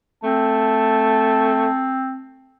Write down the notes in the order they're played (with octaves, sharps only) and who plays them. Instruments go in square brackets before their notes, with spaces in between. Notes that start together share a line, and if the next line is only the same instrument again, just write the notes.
[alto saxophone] A3 [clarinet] C4 [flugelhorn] A5